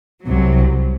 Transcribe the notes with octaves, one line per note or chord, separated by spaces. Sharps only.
C2 C3 F#3